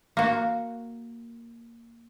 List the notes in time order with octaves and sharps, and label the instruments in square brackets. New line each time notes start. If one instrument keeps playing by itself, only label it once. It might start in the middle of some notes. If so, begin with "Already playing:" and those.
[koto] A#3 F#4